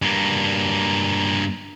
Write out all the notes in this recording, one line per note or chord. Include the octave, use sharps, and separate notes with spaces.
G2 A#3